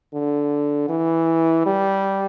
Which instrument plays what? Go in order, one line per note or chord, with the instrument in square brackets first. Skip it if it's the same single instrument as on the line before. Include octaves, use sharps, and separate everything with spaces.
[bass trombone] D3
E3
G3